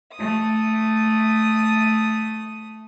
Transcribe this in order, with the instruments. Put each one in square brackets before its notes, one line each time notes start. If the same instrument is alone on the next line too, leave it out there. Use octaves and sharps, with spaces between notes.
[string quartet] A3 D#6